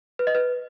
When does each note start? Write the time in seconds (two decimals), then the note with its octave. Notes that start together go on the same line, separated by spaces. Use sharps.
0.19 B4
0.27 D#5
0.35 B4